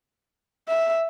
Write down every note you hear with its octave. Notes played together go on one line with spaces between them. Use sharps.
E5